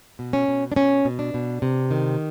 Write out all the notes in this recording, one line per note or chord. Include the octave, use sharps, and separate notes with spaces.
B2
C#4
B2
D4
B2 C#4
B2
D4
B2
C3
D#3